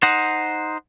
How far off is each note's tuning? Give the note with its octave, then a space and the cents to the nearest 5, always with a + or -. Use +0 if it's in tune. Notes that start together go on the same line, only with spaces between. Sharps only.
D#4 +0 C5 +0 F#5 +0